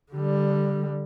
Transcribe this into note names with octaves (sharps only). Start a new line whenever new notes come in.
D3 G3